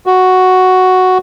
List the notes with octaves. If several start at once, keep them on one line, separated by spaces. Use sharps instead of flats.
F#4